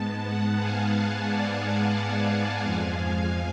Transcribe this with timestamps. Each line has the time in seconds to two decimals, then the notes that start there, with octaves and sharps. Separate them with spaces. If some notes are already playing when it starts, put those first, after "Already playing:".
Already playing: G#2 G#3 B3 A5
0.24 F#5 A5
0.58 F5 G#5
1.26 D5 F#5
2.62 F2 F3 G#3 F5 G#5